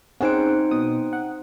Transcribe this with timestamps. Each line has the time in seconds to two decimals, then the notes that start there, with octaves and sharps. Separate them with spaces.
0.21 C4 C#4 D#4 G#4 C5 F#5 D7
0.71 B2 D#6
1.13 F#5